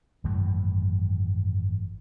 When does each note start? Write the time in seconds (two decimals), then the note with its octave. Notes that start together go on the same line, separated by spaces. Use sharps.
0.24 G#1 F#2 E3 A3